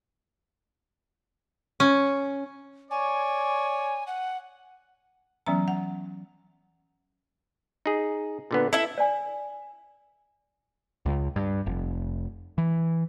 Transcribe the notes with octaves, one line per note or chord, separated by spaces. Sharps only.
C#4
C#5 D5 G#5
F#5
E3 F#3 B3 C#4 A#5
F#5
D#4 G#4
A#2 D3 B3
E4 A4 E5
D5 G#5
C#2
G2
F1
E3